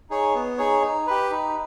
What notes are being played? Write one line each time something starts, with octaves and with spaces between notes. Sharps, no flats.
D#4 G#4 C#5
B3
D#4 G#4 C#5
D#4
G4 B4
D#4